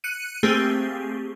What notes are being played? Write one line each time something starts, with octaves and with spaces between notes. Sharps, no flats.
F#6 C#7 D#7
A3 A#3 C4 G4 G#4